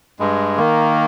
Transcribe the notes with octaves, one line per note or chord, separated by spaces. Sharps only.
G2 G#3
D#3 A#3